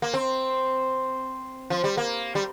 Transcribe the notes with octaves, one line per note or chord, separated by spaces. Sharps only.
A#3
C4
F3
G3
A#3
G3